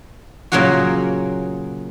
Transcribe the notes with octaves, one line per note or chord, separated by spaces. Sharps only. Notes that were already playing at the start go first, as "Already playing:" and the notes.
A#2 C#3 F#3 A#3 C#4 F#4